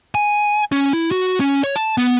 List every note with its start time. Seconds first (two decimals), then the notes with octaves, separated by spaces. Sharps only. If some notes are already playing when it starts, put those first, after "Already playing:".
0.15 G#5
0.72 C#4
0.93 E4
1.11 F#4
1.40 C#4
1.64 C#5
1.76 A5
1.98 B3